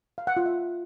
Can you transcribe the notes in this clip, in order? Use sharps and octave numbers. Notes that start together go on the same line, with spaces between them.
F5
F#5
F4
E5